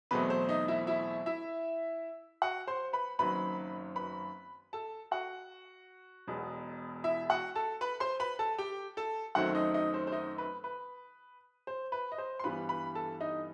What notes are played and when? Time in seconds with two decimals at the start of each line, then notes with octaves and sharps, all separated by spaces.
0.11 E2 B2 F#3 A3 C4 B4
0.30 C5
0.49 D#4 D#5
0.68 E4 E5
0.87 E4 E5
1.26 E4 E5
2.42 F#4 F#5
2.67 C5 C6
2.93 B4 B5
3.19 F#1 F#2 D#3 F#3 C4 B4 B5
3.96 B4 B5
4.73 A4 A5
5.11 F#4 F#5
6.27 E1 E2 B2
7.04 E4 E5
7.30 F#4 F#5
7.55 A4 A5
7.81 B4 B5
8.00 C5 C6
8.20 B4 B5
8.39 A4 A5
8.58 G4 G5
8.97 A4 A5
9.35 F#2 D#3 F#3 A3 C4 F#4 F#5
9.55 D#4 D#5
9.74 D#4 D#5
9.94 C5
10.07 C5
10.12 D#4 D#5
10.38 B4
10.64 B4
11.67 C5
11.92 B4
12.12 D#5
12.18 C5
12.39 C6
12.43 G2 E3 G3 B3 B4 B5
12.69 B4 B5
12.95 A4 A5
13.21 D#4 D#5